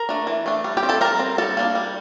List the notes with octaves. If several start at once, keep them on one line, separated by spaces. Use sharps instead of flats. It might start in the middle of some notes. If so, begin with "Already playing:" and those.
Already playing: A#4 A#5
A3 D4
E3
A3 D4
G3
G4 G5
C4
A4 A5
G3 A#4 A#5
C4
G3 A4 A5
A#3 D4
G3